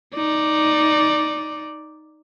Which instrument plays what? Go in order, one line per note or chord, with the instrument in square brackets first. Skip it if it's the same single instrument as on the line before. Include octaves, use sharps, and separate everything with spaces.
[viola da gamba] D#4 D5